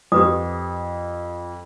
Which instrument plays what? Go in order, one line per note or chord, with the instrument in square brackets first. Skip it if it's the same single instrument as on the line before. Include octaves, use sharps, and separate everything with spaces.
[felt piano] F2 [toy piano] G4 B4 D#6